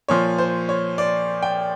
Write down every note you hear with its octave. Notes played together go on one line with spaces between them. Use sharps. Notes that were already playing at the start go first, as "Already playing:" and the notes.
A#2 F3 C#5
C5
C#5
D5
G5